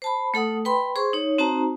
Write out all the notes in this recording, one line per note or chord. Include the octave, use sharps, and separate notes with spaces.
C5 A5 B5
A3 A4 F#5 D#6
B4 G5 B5 C6
G#4 C5 C6 C#6
D#4 C#5
C4 D#4 F#4 C5 A5 A#5